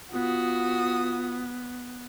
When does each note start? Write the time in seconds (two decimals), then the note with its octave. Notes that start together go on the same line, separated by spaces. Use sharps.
0.13 B3 F4 F#4 D#6